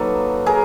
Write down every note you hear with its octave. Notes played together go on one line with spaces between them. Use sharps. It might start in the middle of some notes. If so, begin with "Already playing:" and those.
Already playing: F#3 A#3 D#4 A4 B4
G#4 A#4